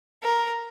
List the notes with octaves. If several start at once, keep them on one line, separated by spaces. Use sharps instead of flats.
A#4